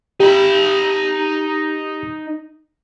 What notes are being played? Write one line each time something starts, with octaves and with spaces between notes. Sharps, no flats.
D#4 G4 B5